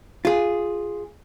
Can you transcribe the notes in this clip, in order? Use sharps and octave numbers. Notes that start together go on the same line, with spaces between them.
F4 G#4